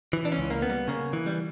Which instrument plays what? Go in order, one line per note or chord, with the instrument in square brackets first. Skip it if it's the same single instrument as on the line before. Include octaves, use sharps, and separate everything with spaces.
[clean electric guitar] E3
[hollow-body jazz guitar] D4
C#4
[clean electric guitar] C#2
[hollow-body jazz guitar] A#3
[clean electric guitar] B3
[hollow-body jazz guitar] G3
[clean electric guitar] C#3 [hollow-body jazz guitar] A#3
[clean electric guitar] E3
[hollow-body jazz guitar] G3